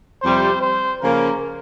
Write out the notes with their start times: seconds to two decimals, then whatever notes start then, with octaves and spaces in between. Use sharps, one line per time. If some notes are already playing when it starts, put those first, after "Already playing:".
0.22 F2 C3 G3 C5
0.61 C5
1.02 C#3 F3 A#3 A#4